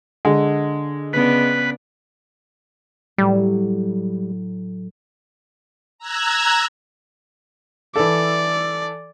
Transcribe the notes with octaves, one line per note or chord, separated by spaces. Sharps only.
D3 G#3
C#3 B3 D4 B4
A2 F#3 G3
A#5 E6 F#6 G#6
E3 A4 D5